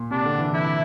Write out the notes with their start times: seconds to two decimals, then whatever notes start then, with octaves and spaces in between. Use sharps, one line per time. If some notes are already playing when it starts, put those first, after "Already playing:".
Already playing: A#2
0.11 C3 D4
0.25 D3
0.39 E3
0.54 E4